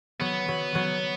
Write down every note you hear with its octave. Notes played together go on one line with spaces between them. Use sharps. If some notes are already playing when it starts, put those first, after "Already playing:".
F#3 B3
F#3
F#3